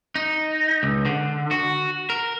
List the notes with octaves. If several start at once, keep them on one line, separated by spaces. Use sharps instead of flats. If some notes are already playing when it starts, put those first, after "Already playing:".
D#4
C#2
D3
F#4
A#4